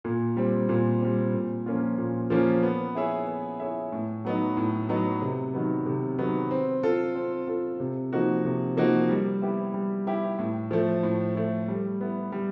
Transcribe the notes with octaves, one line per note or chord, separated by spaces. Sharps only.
A#2
G3 C4
A#2
G3 C4
A#2
F3 A#3 C#4 F4
A#2
F3 A#3 C#4 F4
B3
E4 G#4 C#5 E5
B3
E4 G#4 C#5 E5
A2
F#3 B3 D#4
A2
F#3 B3 D#4
C3
D#3 F#3 B3
C3
D#3 F#3 B3
C4
F4 A4
C4
F4 A4
C3
F3 A#3 D#4 F#4
C3
F3 A#3 D#4 F#4
G3
B3 E4 G4
G3
B3 E4 G4
A2
F3 A3
A2
F3 A3
G3
B3 E4
G3